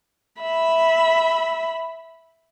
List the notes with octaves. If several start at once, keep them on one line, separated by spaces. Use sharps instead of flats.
E5 B5